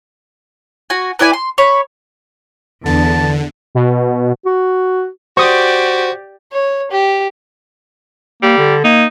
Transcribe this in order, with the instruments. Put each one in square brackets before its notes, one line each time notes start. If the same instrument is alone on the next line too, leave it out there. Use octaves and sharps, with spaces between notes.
[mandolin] F#4 G#5
B3 E4 D5 G#5
C6
C#5 B5
[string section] E2 [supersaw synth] D3 [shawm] A5
[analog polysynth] B2
[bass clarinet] F#4
[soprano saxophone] F#4 [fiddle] G4 D5 [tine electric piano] C5 [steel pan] C#6 D#6
[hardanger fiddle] C#5
G4
[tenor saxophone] G3 [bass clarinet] A#3
[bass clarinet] D3
[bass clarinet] A#3 [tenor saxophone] D#4